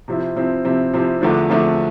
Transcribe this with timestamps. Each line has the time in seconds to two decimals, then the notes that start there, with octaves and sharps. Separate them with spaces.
0.08 C3 F3 C4 E4
0.36 C3 F3 C4 E4
0.65 C3 F3 C4 E4
0.93 C3 F3 C4 E4
1.21 E2 D3 F3 A3 D4
1.50 E2 D3 F3 A3 D4